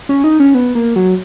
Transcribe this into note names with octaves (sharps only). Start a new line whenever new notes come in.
C#4
D#4
C#4
B3
A#3
F#3